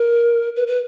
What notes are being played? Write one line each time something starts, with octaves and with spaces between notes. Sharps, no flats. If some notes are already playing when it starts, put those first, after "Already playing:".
Already playing: A#4
B4
B4